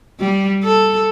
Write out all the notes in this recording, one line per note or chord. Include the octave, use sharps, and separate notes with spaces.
G3
A4